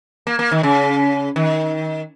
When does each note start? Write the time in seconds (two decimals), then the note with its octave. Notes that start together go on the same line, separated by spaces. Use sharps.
0.27 A#3
0.39 A#3
0.51 D#3
0.63 C#3
1.36 D#3